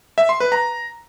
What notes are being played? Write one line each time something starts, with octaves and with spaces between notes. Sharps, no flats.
E5
C6
B4
A#5